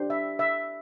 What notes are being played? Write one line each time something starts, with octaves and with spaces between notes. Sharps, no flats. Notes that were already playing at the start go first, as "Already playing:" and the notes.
Already playing: D4 G4 C5
E5
E5